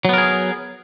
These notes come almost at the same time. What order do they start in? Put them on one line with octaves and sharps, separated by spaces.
F#3 B3 A#4 G#4